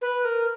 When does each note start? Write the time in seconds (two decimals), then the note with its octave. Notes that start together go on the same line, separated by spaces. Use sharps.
0.01 B4
0.25 A#4